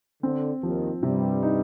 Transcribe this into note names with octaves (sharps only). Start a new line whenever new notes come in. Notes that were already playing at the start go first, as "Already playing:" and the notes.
D3 C4
D#2 D#3 F3
G2 C3 G3
D#4